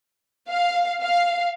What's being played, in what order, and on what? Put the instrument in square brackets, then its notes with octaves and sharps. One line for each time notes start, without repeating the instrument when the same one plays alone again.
[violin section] F5
F5